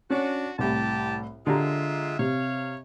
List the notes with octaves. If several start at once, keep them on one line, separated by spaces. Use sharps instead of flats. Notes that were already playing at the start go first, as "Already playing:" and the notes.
C#4 D4 F#4
C2 A2 G4 A5
D3 G#3 F4 G4 E5 A#5
C3 C#5 F5